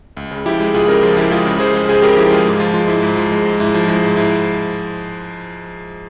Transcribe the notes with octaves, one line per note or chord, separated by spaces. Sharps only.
C#2
C#3
F3 E4 G4
G#3
C#2 F4 G#4
C#3 G4 A#4
F3 F4 G#4
G#3 E4 G4
C#2 F4 G#4
C#3
F3 G#4 C5
G#3
C#2 G#4 C5
C#3 G4 A#4
F3 E4 G4
G#3 F4 G#4
G#2
F3 F4
G#3 F4
G#2 E4
G#2
F3
G#3
G#2
G#2 E4
F3
G#3 E4
G#2
G#2 E4